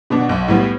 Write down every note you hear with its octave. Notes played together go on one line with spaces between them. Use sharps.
B2 B3 D4
B1
A2 G3 B3